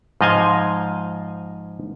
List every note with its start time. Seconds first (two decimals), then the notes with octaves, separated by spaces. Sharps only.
0.21 G#2 F3 D#5 F5 G#5